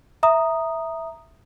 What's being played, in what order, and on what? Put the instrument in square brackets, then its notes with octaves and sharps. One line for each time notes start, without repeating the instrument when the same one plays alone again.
[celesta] E5 A#5 D#6